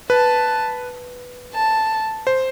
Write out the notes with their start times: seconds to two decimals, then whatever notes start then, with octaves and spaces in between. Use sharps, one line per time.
0.10 B4 A5
1.54 A5
2.27 C5